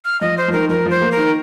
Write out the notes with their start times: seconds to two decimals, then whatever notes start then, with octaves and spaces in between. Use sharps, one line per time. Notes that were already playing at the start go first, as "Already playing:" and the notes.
0.05 F6
0.21 F3 D#5
0.38 C5
0.48 F3
0.53 D#3 A#4
0.69 F3 A#4
0.86 F3 C5
1.01 A#3
1.12 A#4
1.17 D#3